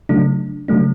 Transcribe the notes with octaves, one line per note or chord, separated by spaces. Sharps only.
C#3 F#3 A3 D4
C#3 F#3 A3 D4